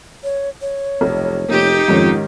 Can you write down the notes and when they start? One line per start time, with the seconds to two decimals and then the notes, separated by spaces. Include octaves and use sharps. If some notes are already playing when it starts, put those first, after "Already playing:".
0.24 C#5
0.61 C#5
1.01 F1 B1
1.48 F1 A#3 D#4 G4
1.88 F2 G#2 D#3 C#4 F4